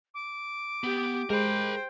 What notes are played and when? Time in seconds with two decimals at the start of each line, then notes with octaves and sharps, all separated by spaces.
0.14 D6
0.84 B3 G4
1.30 G#3 A#4 C5 G5 B5